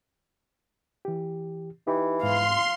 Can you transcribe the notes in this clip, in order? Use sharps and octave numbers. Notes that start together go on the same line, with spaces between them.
E3 G4
E3 D#4 G4
G#2 F5 C6